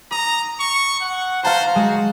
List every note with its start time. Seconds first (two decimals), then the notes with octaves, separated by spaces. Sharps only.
0.11 A#5 D#6
0.59 C#6
1.00 F#5
1.43 C5 F5 A5 A#5
1.76 G#3 F#4